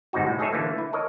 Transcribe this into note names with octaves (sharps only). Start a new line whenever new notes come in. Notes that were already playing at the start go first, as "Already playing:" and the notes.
G1 G#2 C3 D#4 F#4
A2
D#4 G#4 A4 C#5 E5
D3 E3 A3 A#3
E4
A4 A#4 C#5 D#5